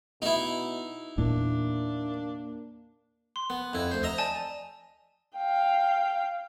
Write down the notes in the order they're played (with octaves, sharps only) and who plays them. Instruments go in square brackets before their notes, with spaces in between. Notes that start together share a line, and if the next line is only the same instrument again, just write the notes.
[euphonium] B2 [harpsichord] D#4 E4
[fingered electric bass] E2 A#2 E3 [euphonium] A#3 [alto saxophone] D4
[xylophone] C6
[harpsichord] B3
F2 E4
D2 C5
D#5 E5 A#5
[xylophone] D5 G#5 A5
[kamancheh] F5 G5